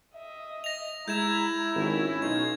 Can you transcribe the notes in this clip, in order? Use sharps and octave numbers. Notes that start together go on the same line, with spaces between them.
D#5 E5
A#6 F7
G#3 E4 A#5 G6 G#6 E7
G#1 C#4
B1 D#4 F4 G#6